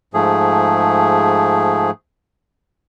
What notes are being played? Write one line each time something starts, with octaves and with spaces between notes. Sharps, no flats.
G#2 F3 A3 G#4